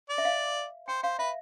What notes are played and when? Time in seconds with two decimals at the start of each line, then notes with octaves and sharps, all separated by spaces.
0.10 D5
0.18 E5
0.25 F5
0.88 C5 G5
1.03 C5 F5
1.19 B4 E5